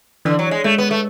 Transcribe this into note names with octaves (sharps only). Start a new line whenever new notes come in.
D3 E3
F#3
G#3
G#3 A3
B3
A3